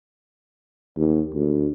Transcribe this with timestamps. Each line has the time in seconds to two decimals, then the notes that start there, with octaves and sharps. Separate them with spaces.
0.96 D#2
1.34 D2